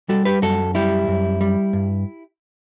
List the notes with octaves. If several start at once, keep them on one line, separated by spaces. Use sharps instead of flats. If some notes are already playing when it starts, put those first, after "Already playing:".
G3 F#4 A4
G4 B4
F#2 F#4 A4
G3 E4 G4
F#2
G3
G2